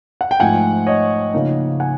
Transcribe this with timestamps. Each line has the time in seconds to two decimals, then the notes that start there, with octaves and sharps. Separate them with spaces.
0.21 F#5
0.31 G5
0.40 G#2 F3 A3 F#5 G#5
0.86 C#5 D#5
1.34 C#3 F3 A#3 D#4
1.80 F#5 G#5